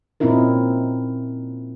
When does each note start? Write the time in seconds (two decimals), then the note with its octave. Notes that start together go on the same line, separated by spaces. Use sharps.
0.20 A#2 C4 C#4 D#4 E4 A#4